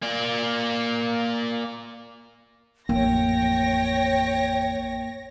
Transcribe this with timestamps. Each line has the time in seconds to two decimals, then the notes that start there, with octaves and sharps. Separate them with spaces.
0.03 A#3 D5
2.89 A1 F2 A#3 C#5 G5 A#6